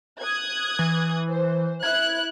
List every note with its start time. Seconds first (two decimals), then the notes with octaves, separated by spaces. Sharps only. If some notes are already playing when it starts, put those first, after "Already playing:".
0.20 D#6 F#6 G#6
0.79 E3
1.30 C5
1.83 E4 F#6 G#6